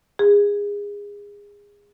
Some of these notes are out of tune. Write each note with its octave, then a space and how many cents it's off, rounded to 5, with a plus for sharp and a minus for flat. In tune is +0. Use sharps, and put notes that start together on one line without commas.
G#4 -25